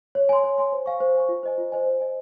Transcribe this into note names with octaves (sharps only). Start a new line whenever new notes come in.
C#5
G#5 C6
C#5
G#5 C6
C5
F5 G#5 C#6
C5
F5 G#5 C#6
F4
C5 D#5 G#5
F4
C5 D#5 G#5
C5
D#5 G#5